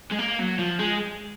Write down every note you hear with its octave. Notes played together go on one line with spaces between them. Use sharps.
G#3
A#3
F#3
F3
G#3